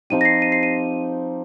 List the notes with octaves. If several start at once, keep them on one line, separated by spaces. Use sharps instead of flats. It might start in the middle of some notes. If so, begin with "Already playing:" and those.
F3 C4 D#4 G4 D#7
A#6
C7
D#7
C7
D#7